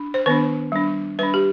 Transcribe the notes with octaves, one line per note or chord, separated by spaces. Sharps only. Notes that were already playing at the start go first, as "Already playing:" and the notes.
Already playing: D4
C5
D#3 B3 D4 B4
G3 D4
G3 D4 B4
G4